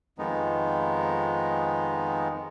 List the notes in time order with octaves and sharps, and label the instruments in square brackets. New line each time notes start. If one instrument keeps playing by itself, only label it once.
[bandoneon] F2 D#3 G#3 B3 D#4